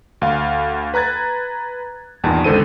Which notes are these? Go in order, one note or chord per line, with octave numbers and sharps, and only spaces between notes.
D2 F5
B4 A#5 F#6 G#6 A6
E2 G2 A#2 D#3 A5
G#1 C#2 D3 A4 C5 D#7